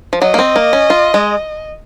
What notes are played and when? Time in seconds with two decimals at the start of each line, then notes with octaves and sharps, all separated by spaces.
0.13 F3
0.22 F#3 D#5
0.34 A#3
0.39 C4
0.56 A#3
0.73 C#4
0.90 F4
1.14 G#3